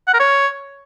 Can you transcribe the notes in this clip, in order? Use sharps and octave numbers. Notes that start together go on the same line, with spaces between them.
F#5
A#4
C#5